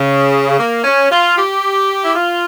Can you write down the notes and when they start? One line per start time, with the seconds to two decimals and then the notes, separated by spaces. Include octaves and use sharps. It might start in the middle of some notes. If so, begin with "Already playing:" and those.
Already playing: C#3
0.59 A#3
0.84 C#4
1.11 F4
1.37 G4
2.04 E4
2.13 F4